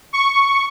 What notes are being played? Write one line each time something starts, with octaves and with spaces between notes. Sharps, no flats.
C#6